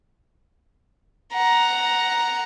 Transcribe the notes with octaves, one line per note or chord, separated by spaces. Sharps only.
F#5 A#5